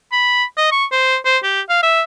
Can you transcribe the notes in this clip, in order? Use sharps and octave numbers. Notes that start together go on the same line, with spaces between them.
B5
D#5
C#6
C5
C5
G4
F5
E5